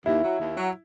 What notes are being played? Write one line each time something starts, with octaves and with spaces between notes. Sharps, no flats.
D#2 E4
F#3
D#2
F#3